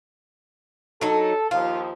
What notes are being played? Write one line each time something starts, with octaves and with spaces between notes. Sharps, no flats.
F#3 D#4 A4
D#2 F3 F4